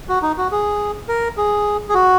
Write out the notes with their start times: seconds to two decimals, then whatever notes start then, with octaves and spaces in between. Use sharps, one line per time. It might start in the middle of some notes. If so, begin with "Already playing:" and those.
0.09 F#4
0.22 D#4
0.38 F#4
0.51 G#4
1.08 A#4
1.37 G#4
1.89 G#4
1.94 F#4